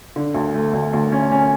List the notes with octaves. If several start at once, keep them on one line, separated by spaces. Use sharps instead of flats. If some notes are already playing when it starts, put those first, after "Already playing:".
D3
D2
A3
D2
D2
C#4
C#4